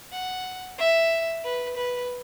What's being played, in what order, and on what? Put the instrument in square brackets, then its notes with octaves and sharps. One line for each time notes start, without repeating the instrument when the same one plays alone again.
[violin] F#5
E5
B4
B4